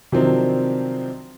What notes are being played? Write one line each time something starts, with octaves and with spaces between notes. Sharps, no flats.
C3 D#3 F3 F#3 C4 D4